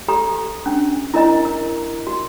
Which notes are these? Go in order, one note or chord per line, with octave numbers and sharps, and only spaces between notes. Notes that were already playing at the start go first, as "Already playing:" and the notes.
G4 A4 A#5
C#4 D4
E4 A#4 D#5 A#5
A#4
F#4